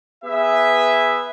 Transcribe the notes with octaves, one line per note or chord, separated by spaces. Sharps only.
B3 G#4 B4 E5